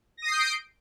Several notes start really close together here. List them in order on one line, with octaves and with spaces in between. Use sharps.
A#6 D#6 C7 G6 D7